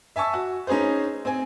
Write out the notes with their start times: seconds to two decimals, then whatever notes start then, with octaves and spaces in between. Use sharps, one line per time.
0.16 E5 G#5 A5 C#6 E6
0.33 F#4
0.67 C#4 D#4 G#4 B4 C5
1.25 C4 G#5